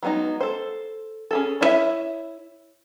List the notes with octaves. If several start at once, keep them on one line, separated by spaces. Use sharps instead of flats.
F#3 G#3 B3 D4 D#4
A4 C5
C#4 G#4 A4
D4 E4 B4 C#5 E5